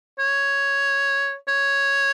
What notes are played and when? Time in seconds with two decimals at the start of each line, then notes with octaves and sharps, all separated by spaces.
0.19 C#5
1.48 C#5